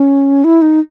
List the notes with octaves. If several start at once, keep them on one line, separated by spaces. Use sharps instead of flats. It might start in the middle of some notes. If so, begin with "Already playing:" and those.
Already playing: C#4
E4
D#4